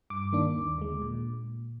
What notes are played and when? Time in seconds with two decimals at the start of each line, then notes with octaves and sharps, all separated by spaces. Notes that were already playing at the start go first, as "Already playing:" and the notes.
0.10 G2 D6
0.33 D#3 A#3 D4
0.55 D#2
0.78 D3 G#3
1.02 A#2